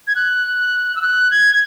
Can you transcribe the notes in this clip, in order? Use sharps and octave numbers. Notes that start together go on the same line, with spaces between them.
G#6
F#6
E6
F#6
G#6